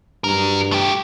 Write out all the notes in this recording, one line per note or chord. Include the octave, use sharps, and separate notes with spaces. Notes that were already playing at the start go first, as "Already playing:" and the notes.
G2 F#3 A#4
A3 G4